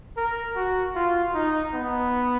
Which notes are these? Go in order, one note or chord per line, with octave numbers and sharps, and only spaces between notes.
A#4
F#4
F4
D#4
B3